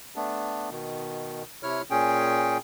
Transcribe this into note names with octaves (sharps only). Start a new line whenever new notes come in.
A3 B3 D4
B2 D#3
C3 E4 C#5 F6
A#2 C#4 G#4 G5